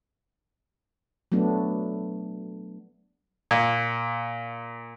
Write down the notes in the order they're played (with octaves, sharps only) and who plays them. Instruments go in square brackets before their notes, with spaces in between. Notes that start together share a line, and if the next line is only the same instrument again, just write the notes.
[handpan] F#3 A3 B3 D4
[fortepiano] A#2